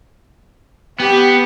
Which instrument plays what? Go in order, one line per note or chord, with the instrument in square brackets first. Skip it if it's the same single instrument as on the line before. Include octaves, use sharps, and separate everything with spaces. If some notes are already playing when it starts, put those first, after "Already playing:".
[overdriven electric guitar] B3 [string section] G4